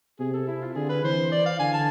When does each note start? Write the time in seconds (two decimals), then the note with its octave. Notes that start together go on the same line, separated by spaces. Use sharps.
0.20 C3 G#4
0.33 A4
0.47 E4
0.61 F4
0.76 D3 G#4
0.89 B4
1.03 E3 C5
1.32 D5
1.46 F5
1.59 D3 G#5
1.74 A5